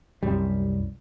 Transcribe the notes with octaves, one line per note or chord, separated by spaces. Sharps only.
C2 F#2 G3